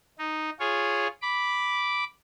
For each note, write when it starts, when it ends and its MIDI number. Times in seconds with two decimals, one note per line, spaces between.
0.18 0.50 63
0.60 1.07 65
0.60 1.07 68
0.60 1.07 73
1.22 2.04 83
1.22 2.04 86